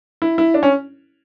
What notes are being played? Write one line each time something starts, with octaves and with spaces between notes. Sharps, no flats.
E4
E4
D4
C#4